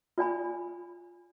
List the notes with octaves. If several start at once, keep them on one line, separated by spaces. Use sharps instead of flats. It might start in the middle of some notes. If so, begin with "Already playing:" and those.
F4 D5 G#5 B5